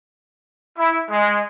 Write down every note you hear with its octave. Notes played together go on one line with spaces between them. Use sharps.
E4
G#3